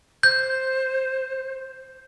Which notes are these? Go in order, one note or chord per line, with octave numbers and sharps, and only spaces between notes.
C5 G6